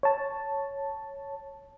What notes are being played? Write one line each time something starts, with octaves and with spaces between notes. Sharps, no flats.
C#5 A5